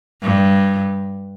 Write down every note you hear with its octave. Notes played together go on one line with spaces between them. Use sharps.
G2